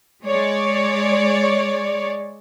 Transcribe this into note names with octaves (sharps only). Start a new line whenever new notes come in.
G#3 C#5 D5